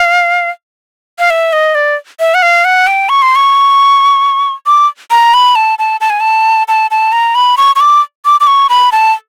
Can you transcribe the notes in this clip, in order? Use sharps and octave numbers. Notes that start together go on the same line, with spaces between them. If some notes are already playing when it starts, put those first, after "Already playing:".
Already playing: F5
F5
E5
D#5
D5
E5
F#5
F5
F#5
G5
C#6
C6
C#6
D6
A#5
B5
A5
A5
A5
G#5
A5
A5
A5
A#5
B5
C#6
C#6
D6
D6
D6
C#6
B5
A5